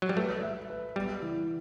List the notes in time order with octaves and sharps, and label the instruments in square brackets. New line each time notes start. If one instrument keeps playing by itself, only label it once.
[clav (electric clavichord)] F#3
G3
[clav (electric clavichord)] A3 [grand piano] B4
[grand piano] E5
B4
[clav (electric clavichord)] G3 [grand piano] B3
[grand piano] E3